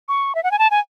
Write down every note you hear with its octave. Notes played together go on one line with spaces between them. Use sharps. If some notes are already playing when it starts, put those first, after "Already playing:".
C#6
E5
F#5
G#5
A5
G#5